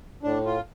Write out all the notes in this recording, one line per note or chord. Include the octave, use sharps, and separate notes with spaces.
A2 D4
F4